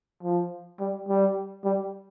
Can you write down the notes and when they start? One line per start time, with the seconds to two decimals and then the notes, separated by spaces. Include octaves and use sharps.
0.23 F3
0.80 G3
1.08 G3
1.64 G3